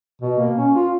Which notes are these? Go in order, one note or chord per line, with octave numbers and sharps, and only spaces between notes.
B2
A#3
C#4
F4